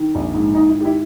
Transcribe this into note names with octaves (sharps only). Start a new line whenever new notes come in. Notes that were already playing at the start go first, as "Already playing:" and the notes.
Already playing: D#3
A#1
G#2
G#2 D#4
E4
D#3
G4
E4